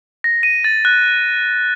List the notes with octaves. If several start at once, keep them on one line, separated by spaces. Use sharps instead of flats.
A#6
D#7
A6
F#6